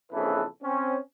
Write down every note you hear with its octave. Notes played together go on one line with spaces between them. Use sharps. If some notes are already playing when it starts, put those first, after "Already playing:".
A#1 F2 C#3 E3 A4 B4
C4 C#4